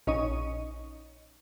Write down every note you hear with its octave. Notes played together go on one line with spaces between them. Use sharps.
A#1 C#4 D#4 D#5 C#6 D#7